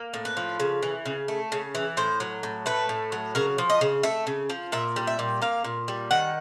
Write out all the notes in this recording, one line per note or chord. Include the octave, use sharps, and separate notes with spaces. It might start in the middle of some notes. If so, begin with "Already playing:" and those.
Already playing: A#3
A2
B4
F3
C#3
E3
C#3
A3
C#3
E3
A2 C5
F#3
A2
A3 B4
A2
F#3
C#3 A#4
F3
D#5
C#3
A3 E5
C#3
F3
A#2 E5
G3
E5
A#2
A#3 F5
A#2
G3
D#3 F#5